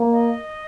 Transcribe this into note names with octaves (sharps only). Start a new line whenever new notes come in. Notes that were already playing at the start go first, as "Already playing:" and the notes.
Already playing: A#3
D#5